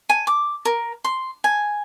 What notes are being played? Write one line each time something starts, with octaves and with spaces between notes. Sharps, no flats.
G#5
D6
A#4
C6
G#5